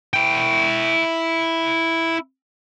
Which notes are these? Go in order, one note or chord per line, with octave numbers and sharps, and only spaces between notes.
E4 G5